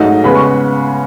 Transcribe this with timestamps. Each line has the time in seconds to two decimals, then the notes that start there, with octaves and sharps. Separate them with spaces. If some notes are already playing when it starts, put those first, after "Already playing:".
Already playing: G#2 F#3 A3 D#4
0.24 C#3 G#3 B3 B5
0.35 C#6